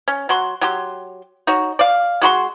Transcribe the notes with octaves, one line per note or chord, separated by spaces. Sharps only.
C#4
F#3 F#4 C6
F#3 G4 C6
D#4 F#4 C#5
D5 F5
G#3 F#4 B5 C6